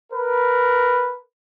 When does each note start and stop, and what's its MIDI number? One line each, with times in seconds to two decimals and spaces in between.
0.12 1.17 70
0.12 1.17 71